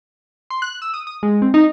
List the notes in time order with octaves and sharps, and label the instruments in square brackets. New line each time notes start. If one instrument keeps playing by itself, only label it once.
[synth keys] C6
F#6
E6
D#6
D#6
G#3
C4
D#4